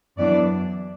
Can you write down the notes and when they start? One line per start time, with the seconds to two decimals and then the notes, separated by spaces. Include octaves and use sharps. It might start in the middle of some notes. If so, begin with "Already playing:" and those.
0.18 F#2 E3 B3 D4 D5